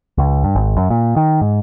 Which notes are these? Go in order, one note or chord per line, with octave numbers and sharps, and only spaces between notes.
C#2
G2
G#1
F#2
A#2
D#3
G#2